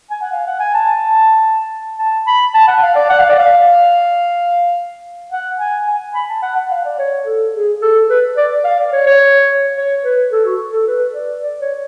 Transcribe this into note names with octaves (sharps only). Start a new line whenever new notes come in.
G#5
F#5
F5
F#5
G#5
A5
A5
B5
A5
F#5
F5
D5
F#5
F5
D5
F5
F#5
G#5
G#5
B5
A5
F#5
F#5
F5
D5
C#5
A4
G#4
A4
B4
D5
F5
D5
C#5
C#5
C#5
B4
A4
F#4
A4
B4
D5
D5
C#5